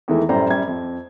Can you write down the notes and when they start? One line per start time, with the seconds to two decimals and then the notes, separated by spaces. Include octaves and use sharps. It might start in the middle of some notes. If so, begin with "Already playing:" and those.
0.08 E2 D#3 E3 G#3 A3
0.29 F#2 A2 G3 C5 D5 A#5
0.50 F#2 G3 G#6
0.67 F2